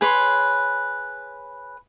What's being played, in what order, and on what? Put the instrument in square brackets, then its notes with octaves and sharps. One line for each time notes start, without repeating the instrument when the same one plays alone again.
[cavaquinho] G#4 B4 C#5 C6